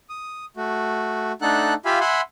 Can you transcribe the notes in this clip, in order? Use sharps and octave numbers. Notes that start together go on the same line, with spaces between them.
D#6
A3 F#4
A3 D4 D#4 A4 F#5 F#6
F4 G4 E5 F5 G#5 B5
E5 F#5 G#5 B5 C6